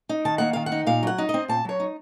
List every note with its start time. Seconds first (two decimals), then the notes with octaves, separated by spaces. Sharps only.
0.09 D#4
0.25 D#3 A5
0.38 A#3 F#5
0.53 D#3 F5
0.66 F#5
0.72 D#4
0.87 A#2 F5
1.03 F#3 F#5
1.18 D#4
1.29 D#5
1.34 C4
1.48 A#2 A5
1.65 F#3 C#5
1.80 D#4